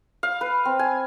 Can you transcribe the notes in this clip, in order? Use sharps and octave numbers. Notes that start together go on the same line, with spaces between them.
F5
B4
C4
G#5